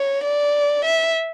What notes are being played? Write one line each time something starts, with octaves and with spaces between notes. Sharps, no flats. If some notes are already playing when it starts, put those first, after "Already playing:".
Already playing: C#5
D5
E5